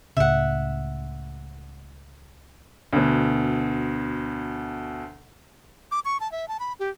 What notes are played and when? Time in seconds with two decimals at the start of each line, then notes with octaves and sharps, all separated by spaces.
0.17 C#2 A2 C#3 E5 F#5
2.93 D2 B2
5.91 D6
6.05 C#6
6.20 A5
6.32 E5
6.48 A5
6.60 B5
6.79 G4